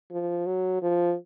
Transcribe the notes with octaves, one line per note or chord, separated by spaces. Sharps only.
F3
F#3
F3